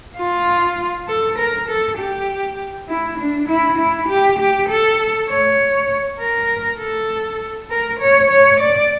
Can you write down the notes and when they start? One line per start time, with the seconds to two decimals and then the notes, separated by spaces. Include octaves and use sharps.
0.18 F4
1.08 A4
1.38 A#4
1.68 A4
1.98 G4
2.89 E4
3.18 D4
3.49 E4
3.78 E4
4.08 G4
4.39 G4
4.69 A4
5.30 C#5
6.19 A#4
6.80 A4
7.70 A#4
8.00 C#5
8.31 C#5
8.60 D5